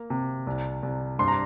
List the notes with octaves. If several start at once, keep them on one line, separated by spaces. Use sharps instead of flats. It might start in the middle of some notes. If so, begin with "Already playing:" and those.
Already playing: A#3
C3
C2
C2
G2 C6
A#5